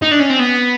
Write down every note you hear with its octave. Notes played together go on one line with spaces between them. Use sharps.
D#4
D4
C#4
C4
B3